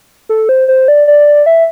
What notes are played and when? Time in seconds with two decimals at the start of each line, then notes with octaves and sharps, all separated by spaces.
0.29 A4
0.49 C5
0.68 C5
0.88 D5
1.07 D5
1.46 E5